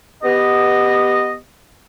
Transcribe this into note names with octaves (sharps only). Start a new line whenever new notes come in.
B3 G4 D#5